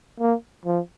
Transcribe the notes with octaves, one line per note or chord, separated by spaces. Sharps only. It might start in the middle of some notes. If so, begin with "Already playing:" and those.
A#3
F3